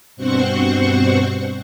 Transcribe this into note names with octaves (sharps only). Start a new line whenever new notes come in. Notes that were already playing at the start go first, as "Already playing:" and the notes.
G2 B2 C4 C5 F#5 C#6